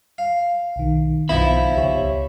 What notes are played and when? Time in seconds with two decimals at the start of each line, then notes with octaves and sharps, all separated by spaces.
0.18 F5
0.76 B1 D#3
1.29 B1 F#2 F3 B3 D#4 E4 E5 B5
1.76 C#2 G4 C#5